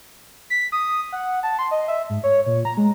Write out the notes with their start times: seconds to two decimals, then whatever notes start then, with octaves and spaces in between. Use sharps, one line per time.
0.50 B6
0.72 D#6
1.12 F#5
1.43 A5
1.59 C6
1.71 D#5
1.88 E5
2.10 G#2
2.24 C#5
2.46 A#2
2.65 A#5
2.77 G#3